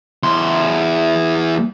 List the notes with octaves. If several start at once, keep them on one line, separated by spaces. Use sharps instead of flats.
E2 C6